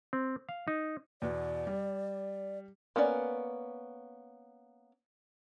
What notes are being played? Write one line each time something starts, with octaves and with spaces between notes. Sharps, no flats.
C4
F5
D#4
E2 B2 D5
G3
A#3 B3 C#4 D5